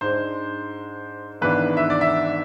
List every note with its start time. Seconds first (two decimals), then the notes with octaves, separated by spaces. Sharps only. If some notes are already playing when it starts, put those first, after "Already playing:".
0.01 G#2 G#3 D4 C5
1.41 G#1 G#2 E3 B3 D4 B4
1.77 E5
1.90 D5
2.01 E5